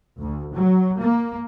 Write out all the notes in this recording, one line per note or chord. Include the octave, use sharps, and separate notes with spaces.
D2
F#3
A#3